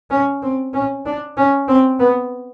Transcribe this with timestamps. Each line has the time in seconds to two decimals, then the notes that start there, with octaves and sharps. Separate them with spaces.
0.10 C#4
0.42 C4
0.74 C#4
1.06 D4
1.37 C#4
1.68 C4
2.00 B3